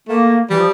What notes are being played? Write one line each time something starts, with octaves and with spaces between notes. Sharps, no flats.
A3 A#3
E3 G3
F3